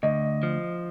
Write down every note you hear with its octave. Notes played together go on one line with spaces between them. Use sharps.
D2 D#5
F3